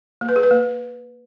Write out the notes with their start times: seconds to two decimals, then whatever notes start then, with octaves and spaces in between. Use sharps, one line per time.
0.21 A#3
0.29 B4
0.36 G#4
0.43 B4
0.51 A#3